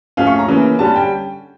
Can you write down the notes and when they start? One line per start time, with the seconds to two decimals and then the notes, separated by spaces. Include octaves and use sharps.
0.17 C#3 F3 A3 C#4 F5
0.27 C#6
0.38 A#5
0.48 C#3 E3 A#3 C#4
0.79 D3 G3 C#4 A5
0.96 G5